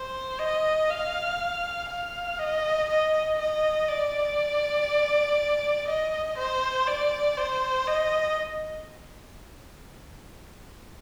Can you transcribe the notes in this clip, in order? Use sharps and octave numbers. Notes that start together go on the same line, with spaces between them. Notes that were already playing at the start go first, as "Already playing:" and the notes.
Already playing: C5
D#5
F5
F5
D#5
D#5
D#5
D5
D#5
C5
D5
C5
D#5